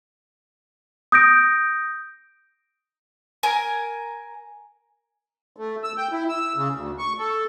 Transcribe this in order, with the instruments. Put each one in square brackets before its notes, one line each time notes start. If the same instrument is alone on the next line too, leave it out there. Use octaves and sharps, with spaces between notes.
[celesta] D#6 G6 A#6 D7
[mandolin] A#4 G#5 A#5
[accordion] A3
E6
G5
E4
E6
C#3
D2
C#6
A4